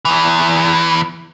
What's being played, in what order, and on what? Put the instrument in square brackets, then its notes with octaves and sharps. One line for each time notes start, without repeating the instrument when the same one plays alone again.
[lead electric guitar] E2 E3